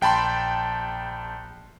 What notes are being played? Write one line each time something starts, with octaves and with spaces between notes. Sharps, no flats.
A#1 G5 A5 B5 C6